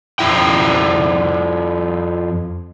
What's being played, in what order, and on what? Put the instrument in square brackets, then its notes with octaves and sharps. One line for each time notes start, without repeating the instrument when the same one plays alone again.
[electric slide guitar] F2 E4 G5